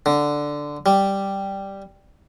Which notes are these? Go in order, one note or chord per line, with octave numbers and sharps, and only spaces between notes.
D3
G3